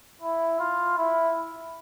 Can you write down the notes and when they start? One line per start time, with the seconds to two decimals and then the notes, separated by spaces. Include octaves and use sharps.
0.21 E4
0.59 F4
0.98 E4